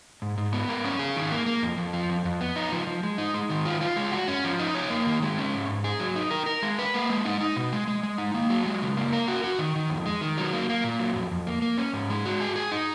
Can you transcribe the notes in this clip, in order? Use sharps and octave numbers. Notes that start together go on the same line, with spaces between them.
G#2
G#2
B3
A#4
C#4
G#4
D#3
A#3
A#3
F2
F2
F3
F2
F2
B3
D#4
F3
F3
G#3
D#4
G#3
D#3
F4
F4
G#3
F#4
C#4
F3
D#4
C#5
A#3
D#3
G#3
C#4
G#2
G#2
G#4
F#3
D#4
A#4
A#4
G#3
B4
A#3
G#3
D#4
D#4
B2
G#3
G#3
G#3
D#4
A#3
F#3
G#3
C#3
A#3
A#4
F#4
F#4
D#3
D#3
F2
G#3
D#3
F#3
A#3
A#3
A#2
F#3
F2
F2
A#3
A#3
C#4
G#2
G#3
F#4
G#4
G#4
D#4